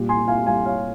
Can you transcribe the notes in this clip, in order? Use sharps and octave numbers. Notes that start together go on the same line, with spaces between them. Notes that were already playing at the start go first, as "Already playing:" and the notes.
Already playing: A#2 G3
G#5 C6
F5 G#5
A#2 G3 F5 G#5
C#5 F5